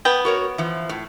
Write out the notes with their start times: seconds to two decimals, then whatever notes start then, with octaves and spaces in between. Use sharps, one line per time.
0.05 B3 G5
0.25 F#4 A#4 C#5
0.58 E3 F3
0.89 A2